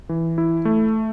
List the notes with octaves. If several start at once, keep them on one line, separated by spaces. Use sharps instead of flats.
E3
E4
A3